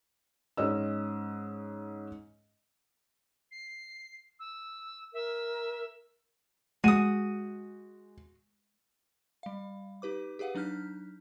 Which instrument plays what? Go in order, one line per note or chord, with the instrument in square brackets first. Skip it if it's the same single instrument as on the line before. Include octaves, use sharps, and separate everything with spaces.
[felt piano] G#2 C#4 D#5 E6
[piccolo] C7
E6
[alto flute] A#4 [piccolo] E5
[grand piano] G#3 D#7 [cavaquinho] F#4 D#6
[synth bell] G3 F5
D#4 G4 B4 D6
G4 G#4 B4 F5 F#5
F#3 D4 D#4 F6 G6 B6